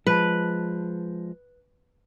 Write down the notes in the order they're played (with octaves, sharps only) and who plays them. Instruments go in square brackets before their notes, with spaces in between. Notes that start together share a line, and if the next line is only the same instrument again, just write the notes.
[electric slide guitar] F3 G#3 A5 [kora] B4